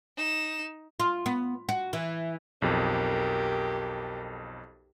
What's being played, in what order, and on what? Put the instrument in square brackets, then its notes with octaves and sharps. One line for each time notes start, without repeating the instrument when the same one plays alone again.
[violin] D#4 E7
[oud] F4
B3
F#4
E3
[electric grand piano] B1 F2 [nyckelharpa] G4 A#4